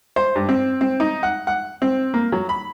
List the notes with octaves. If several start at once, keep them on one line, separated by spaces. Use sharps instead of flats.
C5
G2
C4
C4
D#4
F#5
F#5
C4
A#3
F#3
B5